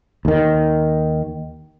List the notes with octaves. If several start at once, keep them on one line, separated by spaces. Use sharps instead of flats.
D#2 D#3